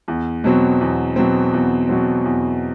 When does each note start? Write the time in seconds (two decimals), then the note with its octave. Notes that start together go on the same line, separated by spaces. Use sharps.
0.08 E2
0.44 B2 F#3 C4
0.81 E2
1.16 B2 F#3 C4
1.53 E2
1.89 B2 F#3 C4
2.25 E2